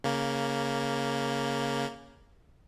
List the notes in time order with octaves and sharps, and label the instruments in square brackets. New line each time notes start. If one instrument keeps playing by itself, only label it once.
[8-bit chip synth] C#3 A#3